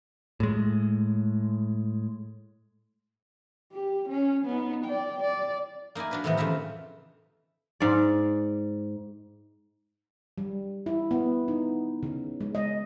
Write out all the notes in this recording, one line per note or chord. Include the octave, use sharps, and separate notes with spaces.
A2 G#3
G4
C#4
B3 D#4
D5 G5
D5
A#3 D#4 E4 D5 G#5
F#3 D4 B4
A2 C3 D#3 E3 B3
F2 C#3 E3 E5 A#5
G#2 D5
G3
E4
B3
D#4
C#3
G#3
D#5